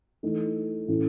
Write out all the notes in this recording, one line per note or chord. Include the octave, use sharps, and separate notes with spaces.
E3 A3 D#4
A2 E3 A3 C#4